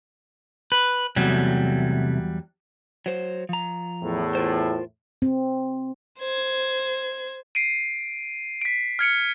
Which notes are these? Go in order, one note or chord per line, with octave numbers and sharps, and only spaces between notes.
B4
E2 C3 F#3 G3 A3
F#3 C5
F3 A#5
E2 A2
F4 A#4 C5
C4
C5 G#6
C7 D7 D#7
B6 D7
F6 G#6 C#7 D7